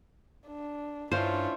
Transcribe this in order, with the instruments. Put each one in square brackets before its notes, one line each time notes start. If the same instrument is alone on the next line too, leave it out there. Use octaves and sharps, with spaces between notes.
[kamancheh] D4
[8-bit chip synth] G2 [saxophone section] A3 C#4 F4 [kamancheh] D4 E4 [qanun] C5